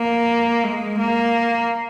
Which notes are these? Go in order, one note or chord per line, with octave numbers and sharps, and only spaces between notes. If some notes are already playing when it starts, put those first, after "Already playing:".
Already playing: A#3
G#3
A#3